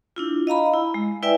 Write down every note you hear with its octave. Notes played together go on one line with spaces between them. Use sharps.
D4 E4 F4
D#5 F5 A#5 B5
E4
G#3
E4 B4 D5 E5 G5 G#5